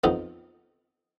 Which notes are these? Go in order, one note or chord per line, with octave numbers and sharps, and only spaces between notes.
F2 F3 B3 D#4